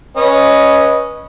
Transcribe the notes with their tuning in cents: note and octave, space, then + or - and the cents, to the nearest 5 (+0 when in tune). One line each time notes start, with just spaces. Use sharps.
C#4 +0 B4 -20 D#5 +0